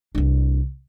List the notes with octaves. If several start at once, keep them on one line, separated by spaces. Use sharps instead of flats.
C2 D4